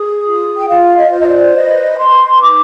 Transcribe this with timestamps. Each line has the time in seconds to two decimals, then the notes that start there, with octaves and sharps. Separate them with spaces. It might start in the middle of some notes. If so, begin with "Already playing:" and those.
Already playing: G#4 D#6
0.25 F4
0.57 G5
0.68 F4 F5
0.97 D#5
1.12 C5
1.20 D#5
1.27 D5
1.55 B4 D#5
1.98 B4 C6
2.41 D#4 D6